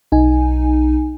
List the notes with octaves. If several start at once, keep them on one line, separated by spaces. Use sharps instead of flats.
B1 D#4 G#5